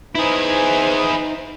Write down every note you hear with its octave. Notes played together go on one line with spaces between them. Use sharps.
D#4 E4 G#4 B4 C5